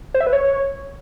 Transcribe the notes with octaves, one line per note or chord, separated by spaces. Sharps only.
C5
E5
B4
C#5